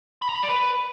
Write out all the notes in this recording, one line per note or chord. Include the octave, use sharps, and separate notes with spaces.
B5
A#5
B5
D5
B4